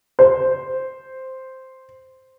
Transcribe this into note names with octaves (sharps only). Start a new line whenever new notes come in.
C5